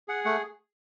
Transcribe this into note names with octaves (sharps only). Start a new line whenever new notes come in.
G#4 F#5
A3 F#5